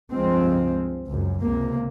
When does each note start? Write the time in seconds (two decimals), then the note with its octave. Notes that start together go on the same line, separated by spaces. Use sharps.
0.13 C#2 G2 F3 G#3 C4
1.08 C#2 F#2
1.42 C#2 C3 A#3